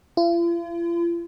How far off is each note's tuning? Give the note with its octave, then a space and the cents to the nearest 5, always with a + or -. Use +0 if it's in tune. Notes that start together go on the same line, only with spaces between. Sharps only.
F4 -45